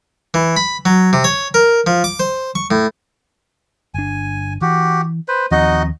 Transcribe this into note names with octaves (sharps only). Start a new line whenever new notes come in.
E3
B5
F#3
C3
C#5
A#4
F3
D6
C5
C#6
A2
G1 D4 G#5
E3 F#4 G4
B4 C5
D#2 F3 C4 D#4 F#4 D#5